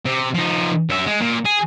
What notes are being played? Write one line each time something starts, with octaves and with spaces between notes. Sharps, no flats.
C3
F3 D#4
F#2 E5
G#3
A#2
G#4